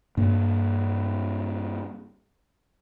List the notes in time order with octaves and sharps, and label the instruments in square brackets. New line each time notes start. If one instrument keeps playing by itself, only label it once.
[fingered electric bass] G2 A#3